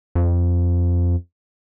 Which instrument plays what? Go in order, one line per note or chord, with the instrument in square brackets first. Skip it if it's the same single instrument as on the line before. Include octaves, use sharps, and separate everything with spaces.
[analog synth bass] F2